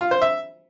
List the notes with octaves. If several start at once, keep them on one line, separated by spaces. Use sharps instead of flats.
F4
C5
E5